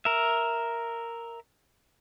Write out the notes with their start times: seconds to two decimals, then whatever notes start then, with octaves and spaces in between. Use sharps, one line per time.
0.05 A#4 E5